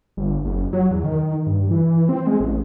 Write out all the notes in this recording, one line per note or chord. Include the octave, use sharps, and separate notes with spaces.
G1
F#1
F#3
E2
D#3
G2
E3
C4
G#3
A1